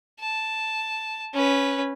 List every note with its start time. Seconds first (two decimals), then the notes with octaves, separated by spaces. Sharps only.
0.20 A5
1.34 C#4 B4